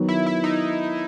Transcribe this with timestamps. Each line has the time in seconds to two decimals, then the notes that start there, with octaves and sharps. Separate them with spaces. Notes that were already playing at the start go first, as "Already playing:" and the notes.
Already playing: D#3 F#3 B3
0.08 E4
0.26 E4
0.44 D#4